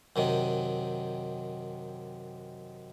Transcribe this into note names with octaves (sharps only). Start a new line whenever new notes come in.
F#2 C3 D#3